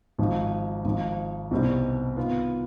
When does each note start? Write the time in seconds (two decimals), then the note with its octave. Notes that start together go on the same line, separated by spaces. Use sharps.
0.18 G#1 G#2 F3
0.85 G#1 G#2 F3
1.51 C2 B2 G3 C4 D#4
2.17 D#3 B3 F4